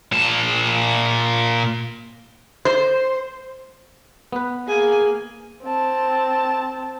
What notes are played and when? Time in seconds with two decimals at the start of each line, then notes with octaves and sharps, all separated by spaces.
0.12 A#2 A5
2.65 C5
4.32 B3 B4
4.67 A#3 G#4 G#5
5.63 C4 A5